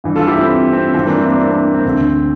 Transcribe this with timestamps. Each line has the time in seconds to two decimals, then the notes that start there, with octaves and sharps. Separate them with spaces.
0.04 G2 E3
0.16 F4 A4
0.27 E4 G4
0.38 C4 E4
0.49 C4
0.72 C4
0.94 G2 E3 C4
1.06 A#3 D4
1.17 C4 E4
1.29 A#3 D4
1.40 C4 E4
1.52 A#3 D4
1.62 A#3
1.74 C4
1.86 D2 D3